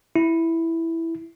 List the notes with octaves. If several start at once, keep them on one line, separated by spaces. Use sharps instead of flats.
E4